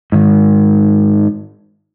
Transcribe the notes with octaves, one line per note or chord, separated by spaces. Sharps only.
G#2 D#3